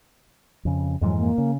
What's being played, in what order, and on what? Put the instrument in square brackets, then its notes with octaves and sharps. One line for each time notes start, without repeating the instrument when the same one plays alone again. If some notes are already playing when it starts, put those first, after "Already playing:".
[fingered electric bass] F2 C#3
[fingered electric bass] F2 G#2 E3 [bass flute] F#3
[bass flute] A#3
[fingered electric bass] C#3